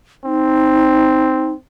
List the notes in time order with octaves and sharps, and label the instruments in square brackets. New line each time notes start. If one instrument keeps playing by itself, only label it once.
[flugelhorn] C4 [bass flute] D#4